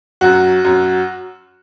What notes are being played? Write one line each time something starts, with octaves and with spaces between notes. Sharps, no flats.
F#2 F#3 F#4
F#2 F#3